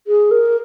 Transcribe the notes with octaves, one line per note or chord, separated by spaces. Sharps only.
G#4
A#4